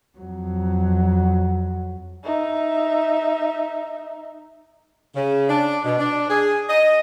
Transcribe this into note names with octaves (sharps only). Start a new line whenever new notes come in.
F2 F#3
D#4 E5
C#3
D4
B2
D4
G#4
D#5